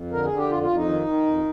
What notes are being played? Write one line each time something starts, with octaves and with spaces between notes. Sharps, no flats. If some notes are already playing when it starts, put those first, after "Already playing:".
Already playing: F2
D3 A#4
G#4
D3
G4
F2 F4
F4
F2
D#4
D#3
D#3
F2